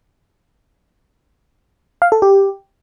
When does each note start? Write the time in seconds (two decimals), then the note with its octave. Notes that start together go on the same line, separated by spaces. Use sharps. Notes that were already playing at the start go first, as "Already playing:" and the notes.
2.02 F5
2.12 A4
2.22 G4